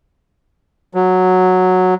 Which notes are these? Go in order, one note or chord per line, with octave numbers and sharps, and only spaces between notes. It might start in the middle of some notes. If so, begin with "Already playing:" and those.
F#3